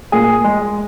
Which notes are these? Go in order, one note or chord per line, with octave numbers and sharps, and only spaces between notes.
A#2 G#4
G#3